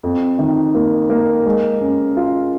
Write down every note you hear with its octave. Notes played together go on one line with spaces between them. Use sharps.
F2
D#3
A#3
A#3
G#3
C#4
F4